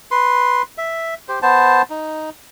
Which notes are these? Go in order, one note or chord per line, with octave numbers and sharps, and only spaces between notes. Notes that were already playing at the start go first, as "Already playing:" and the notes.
B4 C6
E5
G4 C5
B3 C5 A5
D#4